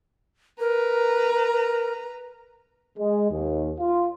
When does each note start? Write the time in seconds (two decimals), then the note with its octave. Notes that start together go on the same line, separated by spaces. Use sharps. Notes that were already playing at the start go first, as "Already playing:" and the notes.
0.60 A#4 B4 A#5
2.98 G#3
3.31 D#2
3.79 F4